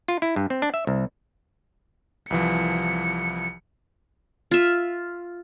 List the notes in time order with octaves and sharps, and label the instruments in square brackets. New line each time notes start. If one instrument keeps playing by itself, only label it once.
[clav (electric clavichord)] F4
E4
G2
C4
D4
E5
C2
[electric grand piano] C2 E3 F3 [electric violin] C#7
[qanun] F4 E5